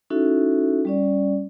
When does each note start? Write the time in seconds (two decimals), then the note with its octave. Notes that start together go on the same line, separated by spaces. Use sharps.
0.10 C#4 D#4 E4 F#4 A4 E5
0.85 G3 C#4 D5